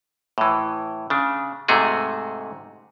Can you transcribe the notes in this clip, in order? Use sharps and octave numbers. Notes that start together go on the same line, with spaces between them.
A2 E3
C#3 D4
G#2 C3 A3 F#4 G#4